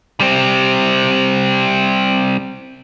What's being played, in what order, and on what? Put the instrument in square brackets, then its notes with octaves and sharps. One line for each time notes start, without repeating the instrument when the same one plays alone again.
[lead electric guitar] G3 C4